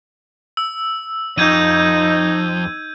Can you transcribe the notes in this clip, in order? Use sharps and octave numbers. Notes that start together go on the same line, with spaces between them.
E6
F2 D#4 G6 G#6 D#7